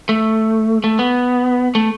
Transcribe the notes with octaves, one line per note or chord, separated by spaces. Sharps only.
A3
A3
B3
A3